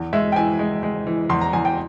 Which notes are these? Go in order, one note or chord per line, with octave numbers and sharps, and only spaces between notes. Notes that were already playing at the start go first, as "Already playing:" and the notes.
Already playing: E2
G#3 E5
G5
E3 G#5
G#3
G#3
E3
E2 C6
A#5
E2 G#5
G5